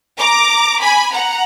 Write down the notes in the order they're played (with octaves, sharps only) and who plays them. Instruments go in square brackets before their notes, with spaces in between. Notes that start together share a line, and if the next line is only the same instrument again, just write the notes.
[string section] A#5 D6
G#5 B5
F#5 A#5